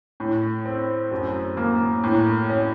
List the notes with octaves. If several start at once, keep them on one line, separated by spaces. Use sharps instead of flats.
A2
C4
F#2
A#3
A2
C#4